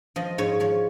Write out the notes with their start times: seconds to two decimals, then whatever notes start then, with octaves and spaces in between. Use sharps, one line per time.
0.16 F3 D#5
0.38 G#2 C#5
0.60 F3 C#5